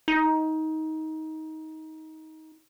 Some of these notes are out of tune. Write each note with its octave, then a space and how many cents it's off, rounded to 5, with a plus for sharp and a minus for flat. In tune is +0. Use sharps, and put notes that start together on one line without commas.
D#4 +20